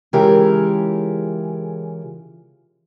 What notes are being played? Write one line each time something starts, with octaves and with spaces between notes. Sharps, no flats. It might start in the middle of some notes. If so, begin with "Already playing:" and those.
C#3 E3 G#3 F4 G4 A#4